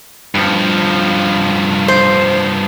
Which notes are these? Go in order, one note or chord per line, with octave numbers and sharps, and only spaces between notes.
G2 F3
C5